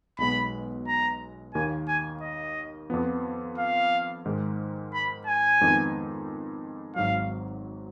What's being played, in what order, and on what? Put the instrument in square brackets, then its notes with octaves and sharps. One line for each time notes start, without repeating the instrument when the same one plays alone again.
[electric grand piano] B1 B2 G#3 B3 [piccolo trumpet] B5
[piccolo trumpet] A#5
[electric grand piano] D#2 D#3 A#3 [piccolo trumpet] G#5
[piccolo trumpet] G#5
D#5
[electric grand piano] F2 F3 B3
[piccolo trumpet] F5
[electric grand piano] G#2 D#3 G#3
[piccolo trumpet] B5
G#5
[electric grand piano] F2 D#3 G#3 B3 D#4
[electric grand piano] G#1 G#2 F#3 [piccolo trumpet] F5